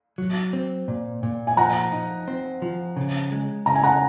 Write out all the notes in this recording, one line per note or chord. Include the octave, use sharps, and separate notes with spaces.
F#3
C4
A#2
A#2
G#5
F3 F#5 A#5
D#4
C4
F3
C#3
G#3
C#3 A#5
G#5
F#5 A#5